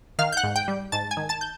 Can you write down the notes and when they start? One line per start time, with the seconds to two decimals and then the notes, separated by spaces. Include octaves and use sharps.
0.19 D#3 F5 F6
0.32 G6
0.37 F#5 F#6
0.44 G#2
0.56 G5 G6
0.68 G3
0.92 G#2 A5 A6
1.11 G#5 G#6
1.17 D#3
1.29 A5 A6
1.41 G6